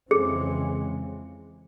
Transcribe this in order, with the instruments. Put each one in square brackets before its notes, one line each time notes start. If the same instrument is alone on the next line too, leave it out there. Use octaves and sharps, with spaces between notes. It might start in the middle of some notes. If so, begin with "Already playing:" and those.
[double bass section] F2 C#3 E3 G#3 C4 [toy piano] G#4